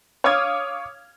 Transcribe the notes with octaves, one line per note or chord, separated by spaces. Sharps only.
C#5 F5 D6 D#6 F6 G#6